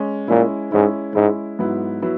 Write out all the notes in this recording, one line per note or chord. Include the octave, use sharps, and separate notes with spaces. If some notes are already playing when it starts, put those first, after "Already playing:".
Already playing: G#3 C#4
A#2 G#3 C#4 E4
G#2 G#3 C#4 E4
G#2 G#3 C#4 E4
G#2 F#3 B3 E4
F#3 B3 E4